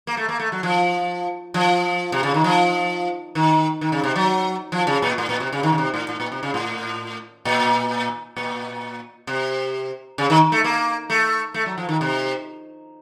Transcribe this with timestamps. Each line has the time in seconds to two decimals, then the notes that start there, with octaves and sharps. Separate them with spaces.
0.07 A#3
0.17 A3
0.29 A#3
0.40 A3
0.52 F#3
0.63 F3
1.54 F3
2.12 C3
2.23 C#3
2.34 D#3
2.44 F3
3.35 D#3
3.81 D#3
3.92 C#3
4.03 C3
4.16 F#3
4.72 F3
4.87 C#3
5.02 A#2
5.18 A2
5.29 A#2
5.40 C3
5.53 C#3
5.63 D#3
5.72 C#3
5.78 C3
5.94 A2
6.09 A2
6.20 A#2
6.32 C3
6.43 C#3
6.54 A2
7.45 A#2
8.36 A#2
9.27 C3
10.18 C#3
10.30 D#3
10.52 A3
10.64 A#3
11.10 A3
11.54 A3
11.66 F#3
11.78 F3
11.89 D#3
12.01 C3